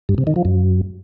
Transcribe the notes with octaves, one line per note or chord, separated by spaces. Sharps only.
G2
C3
D#3
F3
F#2